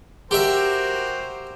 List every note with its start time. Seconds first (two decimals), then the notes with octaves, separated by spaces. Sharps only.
0.31 F#4 G4 A#4 C5 E5